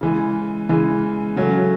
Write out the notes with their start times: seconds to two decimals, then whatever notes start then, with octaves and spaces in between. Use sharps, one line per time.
0.01 C#3 E3 G#3
0.69 C#3 E3 G#3
1.36 C#3 F#3 A3 C#4